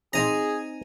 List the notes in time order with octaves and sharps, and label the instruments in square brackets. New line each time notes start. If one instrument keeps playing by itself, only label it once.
[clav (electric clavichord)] C4 D#4 [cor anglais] G#4 [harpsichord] G#5 A#5